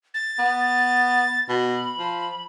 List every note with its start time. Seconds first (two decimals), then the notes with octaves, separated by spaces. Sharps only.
0.14 A6
0.39 B3
1.49 B2 B5
1.99 F3